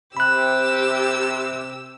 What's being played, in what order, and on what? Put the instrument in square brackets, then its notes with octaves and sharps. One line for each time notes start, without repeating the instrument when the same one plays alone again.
[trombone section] C3 [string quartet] G4 E6 [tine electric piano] B5 F#6